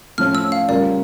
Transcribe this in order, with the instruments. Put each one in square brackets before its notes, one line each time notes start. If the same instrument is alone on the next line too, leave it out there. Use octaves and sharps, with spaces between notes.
[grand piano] A2 F3 C#4 [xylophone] F6
[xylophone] E6
F5
[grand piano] C#3 G3 C#4 F4 A#4 [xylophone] D5